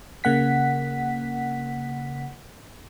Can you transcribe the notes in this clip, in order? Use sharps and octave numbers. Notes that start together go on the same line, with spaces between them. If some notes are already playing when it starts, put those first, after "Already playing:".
C#3 A#3 F#5 B6